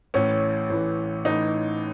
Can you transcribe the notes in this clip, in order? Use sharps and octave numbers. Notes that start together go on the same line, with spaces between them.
A1 A2 E3 C#4
A1 A2 E3
A1 A2 E3 D#4